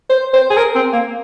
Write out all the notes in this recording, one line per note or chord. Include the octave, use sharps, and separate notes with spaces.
C5
C5
G#4
A#4
C4
A#3